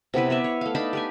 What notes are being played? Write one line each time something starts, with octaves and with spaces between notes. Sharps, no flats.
C3 B3 E4 B4
B3 D5 E5
C#5
A3 F5
D4 D#4 A5 B5
G4 B4 G#5